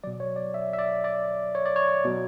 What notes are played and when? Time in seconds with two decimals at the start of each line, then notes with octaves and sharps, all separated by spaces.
0.04 B2 F#3 D5
0.20 C#5
0.36 D5
0.54 E5
0.73 E5
0.79 D5
1.04 D5
1.55 C#5
1.66 D5
1.76 C#5
2.05 B2 F#3